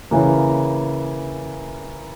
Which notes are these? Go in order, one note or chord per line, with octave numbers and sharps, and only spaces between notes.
C#3 E3 A#3